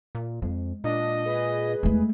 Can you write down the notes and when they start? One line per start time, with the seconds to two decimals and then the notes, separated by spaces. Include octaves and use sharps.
0.15 A#2
0.42 F2 G#3
0.84 A#2 D4 D#5
1.25 G#4 B4
1.83 E2 G#3 A3